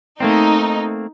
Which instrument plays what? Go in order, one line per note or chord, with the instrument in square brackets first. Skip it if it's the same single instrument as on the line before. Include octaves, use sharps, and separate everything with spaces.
[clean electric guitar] A3 A#3 C4 [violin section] D#4